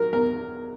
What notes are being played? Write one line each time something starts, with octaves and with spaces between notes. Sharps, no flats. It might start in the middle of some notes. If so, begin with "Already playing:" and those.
Already playing: F#3 A#4
E2 A#4